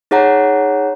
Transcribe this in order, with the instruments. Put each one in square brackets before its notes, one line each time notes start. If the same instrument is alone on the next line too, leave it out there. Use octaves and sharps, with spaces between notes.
[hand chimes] D#4 G#4 C#5 F#5 A#5